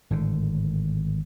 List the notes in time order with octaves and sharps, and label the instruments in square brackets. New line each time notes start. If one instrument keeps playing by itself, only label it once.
[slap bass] G#1 A2 D3